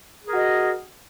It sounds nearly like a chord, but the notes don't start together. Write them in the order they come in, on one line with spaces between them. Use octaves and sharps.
G#4 A#4 F#4 D#5